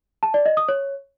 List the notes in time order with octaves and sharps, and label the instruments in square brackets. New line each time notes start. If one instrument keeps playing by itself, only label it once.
[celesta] A5
D5
D#5
D#6
C#5